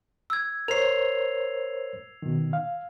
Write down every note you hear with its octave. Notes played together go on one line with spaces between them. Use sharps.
E6 G#6
A#4 C5 C#5 C7 F7
B2 D#3
F5